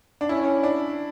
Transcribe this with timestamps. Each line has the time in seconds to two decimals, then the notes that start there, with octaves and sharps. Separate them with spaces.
0.21 D4
0.29 C#4 E4
0.63 D4